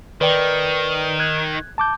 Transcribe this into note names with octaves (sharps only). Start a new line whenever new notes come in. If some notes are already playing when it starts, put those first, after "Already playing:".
D#3 B4 D5 G5
F#6 G#6
A5 D6 G6